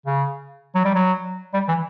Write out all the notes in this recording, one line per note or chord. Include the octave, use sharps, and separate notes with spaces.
C#3
F#3
G3
F#3
G3
E3